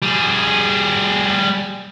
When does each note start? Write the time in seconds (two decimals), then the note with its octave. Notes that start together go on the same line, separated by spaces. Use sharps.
0.03 G3 G#4